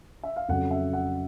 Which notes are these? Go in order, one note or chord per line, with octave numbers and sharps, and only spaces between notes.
E5
F5
F2 C#3 F#3 F#5
E5
F#5